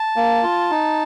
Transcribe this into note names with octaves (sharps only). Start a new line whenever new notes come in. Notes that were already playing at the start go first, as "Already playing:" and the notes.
Already playing: A5
A#3
F4
D#4